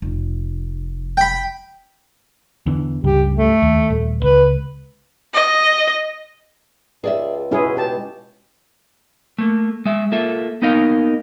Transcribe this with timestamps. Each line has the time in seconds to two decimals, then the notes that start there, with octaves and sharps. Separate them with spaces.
0.02 F1
1.17 G5 B5
2.66 E2 D3 E3
3.04 C#2 G2 C#3 G4
3.35 A3
3.62 D#2
3.90 D#1
4.23 C#2 B4
5.34 D#5
7.04 C#2 G#4 D5 E5
7.51 B2 G#3 C#4 E4 F#4 G#4
7.77 G4 A5
9.38 A3 A#3
9.86 G#3 E5
10.12 A#3 F4 A4 E5
10.62 A#3 B3 D#4 A#4 D#5 F5